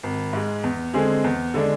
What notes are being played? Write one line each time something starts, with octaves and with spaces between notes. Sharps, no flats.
G#1
G#2 G#3
E2
D3 G#3 C4 G#4
E2
D3 G#3 D4